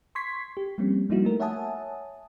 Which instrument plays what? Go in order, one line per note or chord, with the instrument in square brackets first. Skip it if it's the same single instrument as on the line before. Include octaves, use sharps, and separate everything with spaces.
[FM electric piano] C6 C#6 G#6 B6 C7
G4
F3 G3 A#3 C4 C#4
F3 G3 A#3 D#4 E4 F#4
A3 A#4
C#5 E5 F#5 G#5 A5 D#6